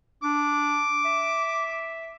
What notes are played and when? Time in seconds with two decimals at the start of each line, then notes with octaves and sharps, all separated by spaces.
0.23 D4 D6
1.05 E5